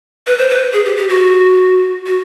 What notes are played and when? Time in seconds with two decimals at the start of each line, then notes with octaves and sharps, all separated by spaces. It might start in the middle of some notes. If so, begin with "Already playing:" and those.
0.27 B4
0.39 C5
0.50 B4
0.73 G#4
0.85 G4
0.97 G4
1.09 F#4
2.06 F#4